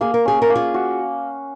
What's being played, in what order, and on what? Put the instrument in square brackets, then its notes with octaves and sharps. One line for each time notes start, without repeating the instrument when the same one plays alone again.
[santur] A#3 [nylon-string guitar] G#4
[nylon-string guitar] A#4
[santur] C#4 [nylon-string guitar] G#4
[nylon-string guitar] A#4
[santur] A#3
[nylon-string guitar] F4 G#4
[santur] F#4